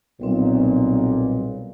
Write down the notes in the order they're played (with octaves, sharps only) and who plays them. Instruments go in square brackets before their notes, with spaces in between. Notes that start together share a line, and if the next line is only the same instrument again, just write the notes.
[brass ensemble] B1 A#2 [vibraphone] G3 C4